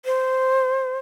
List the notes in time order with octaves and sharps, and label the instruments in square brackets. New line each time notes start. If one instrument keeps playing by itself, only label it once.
[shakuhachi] C5